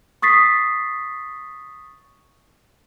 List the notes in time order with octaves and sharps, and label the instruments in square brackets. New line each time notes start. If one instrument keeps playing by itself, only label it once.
[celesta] C#6 D#6 A6 B6 C7